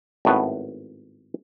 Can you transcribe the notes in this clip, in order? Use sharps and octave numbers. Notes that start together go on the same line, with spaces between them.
G#1 A2 B3